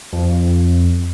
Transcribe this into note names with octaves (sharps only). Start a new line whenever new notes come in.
F2